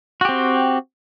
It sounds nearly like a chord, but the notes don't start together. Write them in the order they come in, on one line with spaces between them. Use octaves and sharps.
F#4 G4 C4